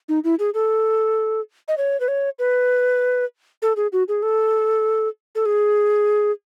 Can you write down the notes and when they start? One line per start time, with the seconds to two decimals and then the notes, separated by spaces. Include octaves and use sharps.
0.09 D#4
0.24 E4
0.39 G#4
0.54 A4
1.68 D#5
1.78 C#5
2.00 B4
2.08 C#5
2.39 B4
3.62 A4
3.76 G#4
3.93 F#4
4.08 G#4
4.23 A4
5.35 A4
5.46 G#4